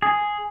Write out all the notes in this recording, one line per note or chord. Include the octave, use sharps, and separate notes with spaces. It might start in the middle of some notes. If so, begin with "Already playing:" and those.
G#4